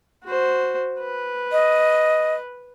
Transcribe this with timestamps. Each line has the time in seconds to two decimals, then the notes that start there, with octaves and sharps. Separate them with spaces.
0.25 F#4 C5
1.00 B4
1.52 D#5